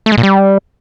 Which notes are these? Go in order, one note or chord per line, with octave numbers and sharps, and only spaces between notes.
A3
G#3
A#2
G3